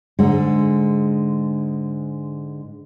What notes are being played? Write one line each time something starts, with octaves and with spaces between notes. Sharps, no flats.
G#2 D3 G#3